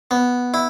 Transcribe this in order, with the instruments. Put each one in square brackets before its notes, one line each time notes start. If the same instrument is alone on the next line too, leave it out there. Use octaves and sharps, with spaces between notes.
[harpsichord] B3
E4